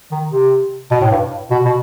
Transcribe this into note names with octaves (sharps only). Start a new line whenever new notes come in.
D#3
C3
B2
A2
G2
B2
B2